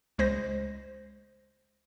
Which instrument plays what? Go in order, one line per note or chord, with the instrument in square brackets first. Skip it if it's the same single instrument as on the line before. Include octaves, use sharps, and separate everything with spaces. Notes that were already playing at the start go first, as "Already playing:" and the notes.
[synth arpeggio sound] C#2 G#3 C5 A#6